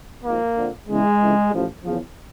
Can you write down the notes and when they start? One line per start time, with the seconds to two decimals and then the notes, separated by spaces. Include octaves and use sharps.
0.23 G#1 G#2 F3 A#3
0.56 F2 D3 F3
0.88 E2 C#3 E3 G#3
1.20 F2 C#3 E3
1.52 A1 A2 F3
1.84 E2 C#3 F3